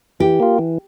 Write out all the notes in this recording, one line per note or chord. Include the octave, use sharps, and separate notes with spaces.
E3 G4
A#3 F4
E3